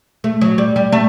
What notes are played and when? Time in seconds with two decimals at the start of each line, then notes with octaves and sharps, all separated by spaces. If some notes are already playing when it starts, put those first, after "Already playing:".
0.24 A3
0.41 F#3
0.58 G3
0.76 G3
0.92 A3